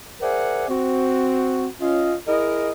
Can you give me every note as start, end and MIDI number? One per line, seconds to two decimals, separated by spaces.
0.21 0.66 68
0.21 0.66 70
0.21 0.66 72
0.21 0.66 74
0.21 0.66 76
0.21 0.66 78
0.69 1.67 60
0.69 1.67 66
1.81 2.15 61
1.81 2.15 65
1.81 2.15 75
2.27 2.71 64
2.27 2.71 68
2.27 2.71 70
2.27 2.71 75